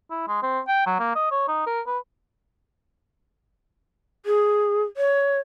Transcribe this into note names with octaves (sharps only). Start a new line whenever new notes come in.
E4
G#3
C4
G5
F#3
A#3
D#5
C#5
D#4
A#4
B4
G#4
C#5